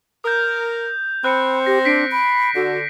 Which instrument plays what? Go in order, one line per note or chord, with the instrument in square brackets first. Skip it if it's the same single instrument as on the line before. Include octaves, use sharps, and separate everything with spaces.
[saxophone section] A#4 [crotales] D#6 G6
[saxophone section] C4 [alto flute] B5 [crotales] F#6 C#7
[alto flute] G4 [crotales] A#6
[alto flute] D4 [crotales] B6 C7 D7
[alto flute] B5
[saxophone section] D3 [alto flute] F#4